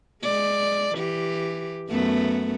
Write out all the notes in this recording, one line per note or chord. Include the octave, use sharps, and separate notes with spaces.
G#3 D5
E3 G4
F#2 A3 B3